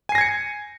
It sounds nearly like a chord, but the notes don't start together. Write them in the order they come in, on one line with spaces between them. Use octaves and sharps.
G#5 C7 A#6 G#6 C#7